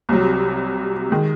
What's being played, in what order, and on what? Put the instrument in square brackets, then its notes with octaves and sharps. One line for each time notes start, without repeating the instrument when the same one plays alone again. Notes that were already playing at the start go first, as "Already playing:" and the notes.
[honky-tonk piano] C2 C3 F#3
D#3 G#3